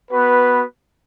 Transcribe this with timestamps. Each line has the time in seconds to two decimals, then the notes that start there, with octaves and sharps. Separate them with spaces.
0.11 B3 F#4 B4